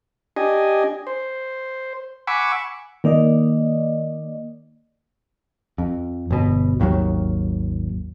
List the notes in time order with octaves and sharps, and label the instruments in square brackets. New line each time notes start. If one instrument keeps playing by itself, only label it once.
[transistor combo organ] D4 G4 D#5 G#5
C5
F#5 G#5 B5 C#6 D6 E6
[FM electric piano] D#3 A#3 D5 D#5
[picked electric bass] F2
G1 B2
G#1 D#2 D#3 F#3